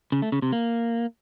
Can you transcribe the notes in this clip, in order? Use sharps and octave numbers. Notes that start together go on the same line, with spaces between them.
C#3
A3
C#3
C3
A#3